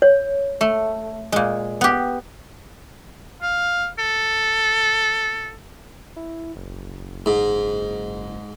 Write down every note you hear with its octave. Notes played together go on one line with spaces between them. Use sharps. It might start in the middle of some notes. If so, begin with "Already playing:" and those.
C#5
A3
A#2 G#3
B3 G4
F5
A4
E4
F#1
G#2